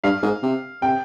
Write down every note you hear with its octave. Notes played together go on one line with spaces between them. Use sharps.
G2 F5
G#2
C3
C3 G5